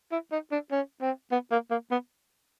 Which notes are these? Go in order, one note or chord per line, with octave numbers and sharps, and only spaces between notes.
E4
D#4
D4
C#4
C4
B3
A#3
A#3
B3